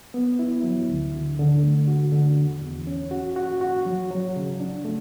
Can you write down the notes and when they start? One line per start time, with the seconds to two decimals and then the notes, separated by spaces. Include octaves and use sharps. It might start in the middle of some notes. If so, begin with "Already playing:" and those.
0.14 B3
0.39 E4
0.64 F#3
0.89 D2
1.14 D3
1.39 D3
1.63 A3
1.88 F#4
2.12 D3
2.37 E2
2.62 E2
2.87 C#4
3.11 F#4
3.36 F#4
3.61 F#4
3.86 F#3
4.10 F#3
4.36 C#3
4.60 D4
4.85 A3